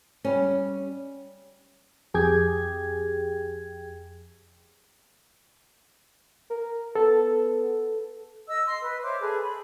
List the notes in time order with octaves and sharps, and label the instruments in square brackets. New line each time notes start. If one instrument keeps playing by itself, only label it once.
[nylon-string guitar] G3 C#4
[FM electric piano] F2 G4 G#4 G5 G#6
[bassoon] A#4
[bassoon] B3 [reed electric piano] A4
[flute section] D#5 E6
C6
B4
C5 C#5 E5 D6
G#4 A4 B4
B5